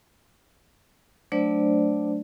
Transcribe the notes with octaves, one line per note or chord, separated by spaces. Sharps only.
F#3 A3 D4 C5 D5